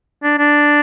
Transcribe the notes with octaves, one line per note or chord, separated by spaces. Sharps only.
D4
D4